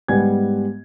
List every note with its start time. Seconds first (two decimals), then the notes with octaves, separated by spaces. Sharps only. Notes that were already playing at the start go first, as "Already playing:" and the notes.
0.08 G#2 G3 B3 F#5 G#5 G#6